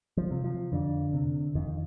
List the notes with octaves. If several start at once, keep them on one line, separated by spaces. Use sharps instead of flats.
F3
C3
F3
F2 D3
C3
F2 D#3